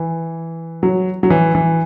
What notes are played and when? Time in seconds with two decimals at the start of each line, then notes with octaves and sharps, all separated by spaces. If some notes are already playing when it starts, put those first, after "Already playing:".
Already playing: E3
0.83 F#3
1.23 F#3
1.30 E3
1.55 E3